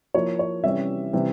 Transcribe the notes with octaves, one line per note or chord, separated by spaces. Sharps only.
F3 A#3 E4 C#5
C#5
C3 E3 G3 C#4 E5
C3 E3 G3 C4